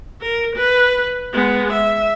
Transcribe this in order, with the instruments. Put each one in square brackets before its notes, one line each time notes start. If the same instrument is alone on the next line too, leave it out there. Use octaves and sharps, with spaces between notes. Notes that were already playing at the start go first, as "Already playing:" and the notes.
[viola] A#4
B4
G#3 B3
E5